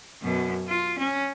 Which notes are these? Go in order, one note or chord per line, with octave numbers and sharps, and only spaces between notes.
F#2 B2
F4
C#4